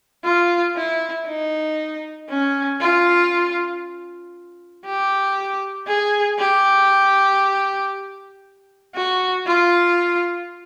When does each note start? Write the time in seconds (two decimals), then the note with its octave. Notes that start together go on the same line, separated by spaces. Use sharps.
0.24 F4
0.76 E4
1.27 D#4
2.29 C#4
2.81 F4
4.85 G4
5.87 G#4
6.39 G4
8.95 F#4
9.46 F4